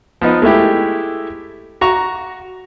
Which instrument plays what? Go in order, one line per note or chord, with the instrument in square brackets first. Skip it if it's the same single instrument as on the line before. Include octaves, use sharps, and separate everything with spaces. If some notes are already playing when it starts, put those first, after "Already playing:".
[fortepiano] F3 B3 D#4
G#3 A3 E4 G4
F#4 A#5 C#6